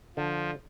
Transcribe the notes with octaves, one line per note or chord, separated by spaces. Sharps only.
D3 F3